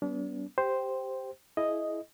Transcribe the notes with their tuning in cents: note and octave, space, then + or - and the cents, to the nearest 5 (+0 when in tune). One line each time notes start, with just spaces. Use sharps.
G3 -45 B3 +0 D4 -40
G4 +0 C5 +0 G5 +0
E4 +0 G#4 +35 D#5 +0